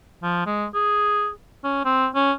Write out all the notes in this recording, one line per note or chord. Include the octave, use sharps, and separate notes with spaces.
F3
G#3
G#4
C#4
C4
C#4